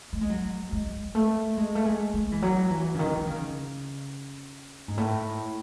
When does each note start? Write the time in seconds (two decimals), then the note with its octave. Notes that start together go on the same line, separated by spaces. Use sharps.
0.13 A3
0.21 G#3
0.30 F#3
0.72 G#3
1.15 A3
1.57 G#3
1.75 A3
1.85 G#3
2.14 G#3
2.32 E3
2.42 F#3
2.70 E3
2.95 C#3
2.99 D#3
3.17 D#3
3.27 C#3
4.88 G#2
4.97 A2